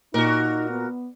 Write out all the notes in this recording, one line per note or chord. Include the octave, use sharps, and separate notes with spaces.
A#2 D#4 F#4 A#4
B3